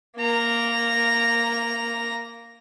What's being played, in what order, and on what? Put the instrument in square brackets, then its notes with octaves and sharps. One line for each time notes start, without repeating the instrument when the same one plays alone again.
[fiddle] A#3 A#5